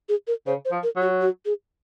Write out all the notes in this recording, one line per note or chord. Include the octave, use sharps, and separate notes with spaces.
G#4
A#4
C#3 C5
C5
F3
A#4
F#3
F#4
F#4
G#4